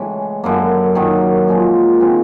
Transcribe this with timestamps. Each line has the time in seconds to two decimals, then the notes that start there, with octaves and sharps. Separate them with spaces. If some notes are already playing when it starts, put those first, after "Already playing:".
Already playing: A2 C#3 E3 G#3 C#4
0.44 F#2 D3 F#3 A#3
0.95 F#2 D#3 F#3
1.48 A#2 F3 G#3
2.00 D#3 G#3 C4 F4